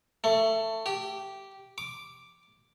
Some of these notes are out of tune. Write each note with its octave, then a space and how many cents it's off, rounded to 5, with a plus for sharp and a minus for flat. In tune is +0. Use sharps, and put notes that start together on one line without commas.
A3 +20
G4 -10
D6 +0